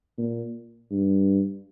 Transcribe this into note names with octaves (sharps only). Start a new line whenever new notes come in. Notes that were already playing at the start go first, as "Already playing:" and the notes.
A#2
G2